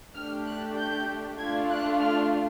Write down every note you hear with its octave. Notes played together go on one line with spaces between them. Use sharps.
A3 D4 G4 F6
F#6
G6
A3 D4 F4 G#6
F#6
F6